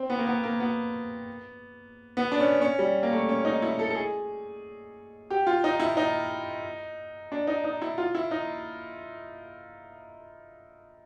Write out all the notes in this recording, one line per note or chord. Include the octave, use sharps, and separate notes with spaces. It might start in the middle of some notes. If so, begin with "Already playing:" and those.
Already playing: C4
B3
A#3
B3
A#3
B3
B3
D4
C#4
C#4
G3
A#3
A3
C#4
D#4
E4
A4
A4
G#4
G4
F4
D#4
E4
D#4
D4
D#4
D#4
E4
F4
E4
D#4